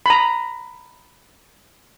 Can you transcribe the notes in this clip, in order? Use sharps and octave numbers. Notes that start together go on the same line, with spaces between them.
A#5 B5